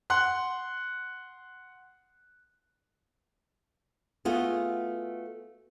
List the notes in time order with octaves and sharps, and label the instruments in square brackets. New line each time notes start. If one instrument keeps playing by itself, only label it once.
[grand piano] F#5 C6 F#6
[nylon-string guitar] A3 B3 F4 F#4 G#4